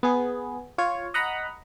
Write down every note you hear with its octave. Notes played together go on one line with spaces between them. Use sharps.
B3 G#4
F4 C#5
D#5 F#5 A#5 B5